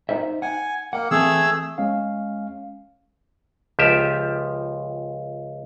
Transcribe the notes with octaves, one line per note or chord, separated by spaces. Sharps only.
D#4 C5 E5
F#5 G#5
A#3 F#5
E3 A3 C4 G#4 A4 E6
G#3 C#4 F5
C#2 F3 G4 E5